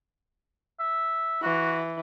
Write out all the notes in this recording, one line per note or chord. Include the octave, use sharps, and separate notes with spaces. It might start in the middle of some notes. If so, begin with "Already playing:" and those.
E5
E3 F#4